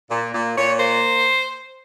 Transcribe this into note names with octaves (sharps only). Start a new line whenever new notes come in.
A#2
A#2
A#2 C#5
A#3 C5